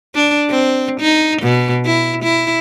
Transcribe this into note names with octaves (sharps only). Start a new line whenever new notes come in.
D4
C4
D#4
B2
E4
E4